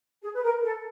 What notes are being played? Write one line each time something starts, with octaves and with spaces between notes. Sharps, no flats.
G#4
B4
A#4
A4